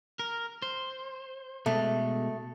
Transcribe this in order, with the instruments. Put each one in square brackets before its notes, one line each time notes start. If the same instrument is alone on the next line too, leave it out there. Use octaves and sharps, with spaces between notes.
[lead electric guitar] A#4
C5
[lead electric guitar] B2 G#3 [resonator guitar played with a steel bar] A3